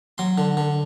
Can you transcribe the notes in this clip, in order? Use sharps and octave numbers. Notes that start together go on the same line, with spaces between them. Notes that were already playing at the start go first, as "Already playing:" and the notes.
F#3 C6
D3
D3